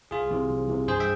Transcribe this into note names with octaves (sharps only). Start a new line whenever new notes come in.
C2 F4 G#4
C3 E3
C2
C3 E3
G2 G#4 C5
E5 G5